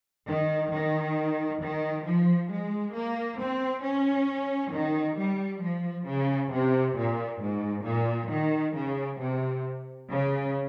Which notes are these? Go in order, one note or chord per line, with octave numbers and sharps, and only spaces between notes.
D#3
D#3
D#3
F3
G#3
A#3
C4
C#4
D#3
G3
F3
C#3
C3
A#2
G#2
A#2
D#3
C#3
C3
C#3